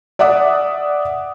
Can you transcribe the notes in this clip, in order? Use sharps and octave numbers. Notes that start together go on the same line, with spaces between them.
D5 E5 F#5 D6 D#6